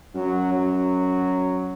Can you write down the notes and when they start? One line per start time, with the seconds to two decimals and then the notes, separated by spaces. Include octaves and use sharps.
0.15 F#2 F#3
0.54 F#3